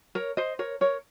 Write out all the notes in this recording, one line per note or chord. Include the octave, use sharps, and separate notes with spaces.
A#4 C#5
C5 D#5
A#4 C#5
A#4 C#5